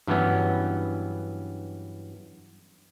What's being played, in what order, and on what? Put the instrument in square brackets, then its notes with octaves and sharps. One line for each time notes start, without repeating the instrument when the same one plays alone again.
[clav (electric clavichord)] G2 E3 F#3 B3 C#4